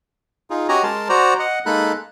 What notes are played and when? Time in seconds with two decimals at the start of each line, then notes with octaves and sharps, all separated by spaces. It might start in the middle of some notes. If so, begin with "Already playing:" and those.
0.50 D#4 F4 G#4
0.69 C#4 F#4 G4 D#5 G#5 A#5
0.83 G#3 A#4 A5 C6
1.09 F#4 C5 D5 A#5
1.39 D#5 F#5
1.66 G#3 A#3 D#4 A4 B5 F#6